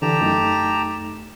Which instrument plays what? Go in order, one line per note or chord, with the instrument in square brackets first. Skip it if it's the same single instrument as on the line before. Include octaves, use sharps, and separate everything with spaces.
[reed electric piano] D3 E3 [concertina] G4 A5 A#5
[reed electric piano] F#2 A3 D#4